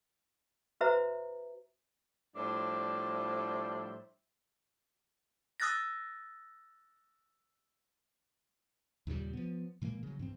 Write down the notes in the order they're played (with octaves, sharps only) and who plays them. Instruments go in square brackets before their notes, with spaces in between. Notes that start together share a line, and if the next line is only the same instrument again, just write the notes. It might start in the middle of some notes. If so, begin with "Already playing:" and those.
[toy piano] F#4 B4 C5 E5 A#5
[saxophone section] A2 F3 G3 D4 C5 E5
[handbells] D#6 E6 F#6 A6 A#6
[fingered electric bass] D#2 A#2 C#3 G3
F3 B3
A#2 E3 G#3 A#3
C#3 F#3
G2 E3 C4